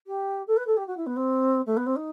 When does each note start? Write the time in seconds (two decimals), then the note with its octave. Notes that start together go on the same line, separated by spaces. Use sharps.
0.07 G4
0.47 A4
0.57 B4
0.67 A4
0.77 G4
0.87 F#4
0.97 E4
1.06 B3
1.16 C4
1.66 A3
1.77 B3
1.86 C4
1.96 D#4